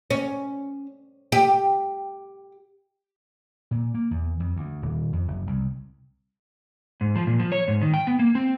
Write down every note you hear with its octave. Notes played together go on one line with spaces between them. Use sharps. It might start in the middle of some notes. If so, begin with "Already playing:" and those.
C#4
G4
A#2
A#3
E2
F2
D2
D#1
F2
F#1
C2
G#2
F3
A#2
F3
C#5
G#2
D#3
G5
B3
A#3
C4